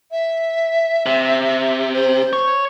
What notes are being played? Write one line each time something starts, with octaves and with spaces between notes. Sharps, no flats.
E5
C3
C5
C#5